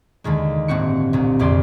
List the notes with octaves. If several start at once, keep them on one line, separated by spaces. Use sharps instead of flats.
D#2 D3 D#3 G#3
G1 A2 A#3 C4 F#4 C#7
C2 A#2
A#1 F2 D3 D5 C6 D#7